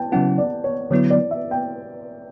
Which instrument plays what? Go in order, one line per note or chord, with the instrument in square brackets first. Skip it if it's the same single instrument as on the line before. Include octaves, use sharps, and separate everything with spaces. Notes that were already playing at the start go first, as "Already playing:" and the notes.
Already playing: [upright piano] G5 A5
[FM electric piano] C#3 F#3 C#4 E4 [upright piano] F#5
[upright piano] D5
C#5
[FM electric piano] D3 F#3 B3 E4 [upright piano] C#5
[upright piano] D5
E5
G5